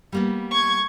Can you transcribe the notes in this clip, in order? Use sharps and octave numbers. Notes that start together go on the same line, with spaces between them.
G3 A#3 B3
C#6 G#6